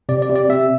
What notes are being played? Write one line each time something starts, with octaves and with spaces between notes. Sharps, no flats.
C3 D5
D5
C3
D5
C3 E5